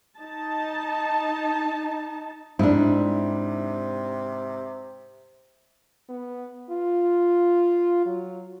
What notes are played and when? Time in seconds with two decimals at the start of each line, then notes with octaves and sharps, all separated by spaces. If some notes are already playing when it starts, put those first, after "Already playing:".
0.18 D#4 A5
2.59 G#2 C3 D4 E4
6.09 B3
6.70 F4
8.05 F#3